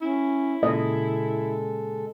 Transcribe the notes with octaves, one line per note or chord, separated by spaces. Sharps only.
C#4 E4
A#2 C#3 G#3 A4 D#5